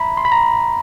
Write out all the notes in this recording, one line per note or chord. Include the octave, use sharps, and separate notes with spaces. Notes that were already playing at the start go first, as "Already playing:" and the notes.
Already playing: E5 A#5 B5
C6
B5
A#5